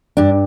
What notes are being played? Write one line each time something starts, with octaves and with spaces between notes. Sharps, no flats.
G2 D4